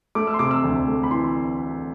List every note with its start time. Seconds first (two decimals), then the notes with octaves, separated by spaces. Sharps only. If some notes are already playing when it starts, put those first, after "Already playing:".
0.15 A3 D6
0.27 E6
0.34 C6
0.39 C3 D6
0.51 E6
0.64 D2
0.88 A3
1.03 B5
1.11 E3 C6